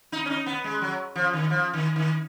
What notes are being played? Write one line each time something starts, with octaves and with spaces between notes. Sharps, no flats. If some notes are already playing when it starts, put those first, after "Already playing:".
D#4
C#4
D#4
B3
G#3
F#3
F3
D#3
F3
D#3
D#3